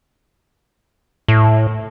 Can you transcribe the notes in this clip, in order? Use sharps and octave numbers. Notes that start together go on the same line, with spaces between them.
A2